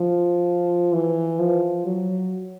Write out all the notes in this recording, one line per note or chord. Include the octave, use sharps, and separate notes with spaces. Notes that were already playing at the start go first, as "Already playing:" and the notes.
Already playing: F3
E3
F3
F#3